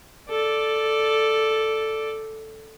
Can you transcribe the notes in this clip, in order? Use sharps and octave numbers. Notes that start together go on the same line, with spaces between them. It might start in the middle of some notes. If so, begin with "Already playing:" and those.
A4 D5